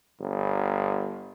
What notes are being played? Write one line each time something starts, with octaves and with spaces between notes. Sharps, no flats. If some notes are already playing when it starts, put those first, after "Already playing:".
G1